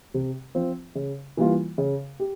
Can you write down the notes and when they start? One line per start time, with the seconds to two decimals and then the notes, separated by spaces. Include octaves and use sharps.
0.14 C3
0.55 F3 C4 F4
0.95 C#3
1.37 E3 G3 A#3 F4
1.78 C#3
2.20 G4